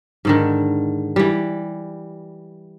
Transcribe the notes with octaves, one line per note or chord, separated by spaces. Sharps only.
G#2 D3 D#3
E3 G3